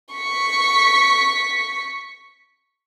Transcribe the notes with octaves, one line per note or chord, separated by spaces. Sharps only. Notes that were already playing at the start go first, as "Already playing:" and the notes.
C#6 B6